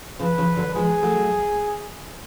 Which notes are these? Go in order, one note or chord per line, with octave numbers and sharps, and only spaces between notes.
C#3 F3 B4
C#3 F3
D3 F#3
F3 G#3 G#4
F#3 A3